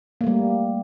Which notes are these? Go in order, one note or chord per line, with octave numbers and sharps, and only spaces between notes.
G3 A3 A#3